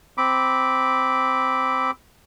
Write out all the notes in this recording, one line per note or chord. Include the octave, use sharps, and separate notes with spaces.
C4 B5 D6